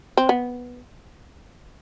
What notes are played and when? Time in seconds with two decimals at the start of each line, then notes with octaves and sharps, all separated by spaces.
0.17 C4
0.29 B3